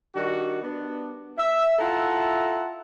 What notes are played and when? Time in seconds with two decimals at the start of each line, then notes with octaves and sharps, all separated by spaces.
0.15 D#3 G3 D4 F#4
0.63 B3 D4
1.38 E5
1.79 E4 F4 A4 F#5 A5 A#5